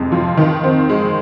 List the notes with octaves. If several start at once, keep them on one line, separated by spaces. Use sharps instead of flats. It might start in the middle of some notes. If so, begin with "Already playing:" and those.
Already playing: F2 C3 G#3
F3
D#3
C4
G#3